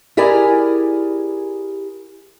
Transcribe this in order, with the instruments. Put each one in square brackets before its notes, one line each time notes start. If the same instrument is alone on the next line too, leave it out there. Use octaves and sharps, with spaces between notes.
[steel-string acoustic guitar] E4 G4 G#4 A#4 D5 G#5